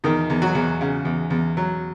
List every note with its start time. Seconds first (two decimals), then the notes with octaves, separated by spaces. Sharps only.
0.04 E2 D#3 D#4
0.30 E2
0.42 F#3 F#4
0.55 E2
0.81 C#3
1.05 E2
1.30 E2
1.57 F#3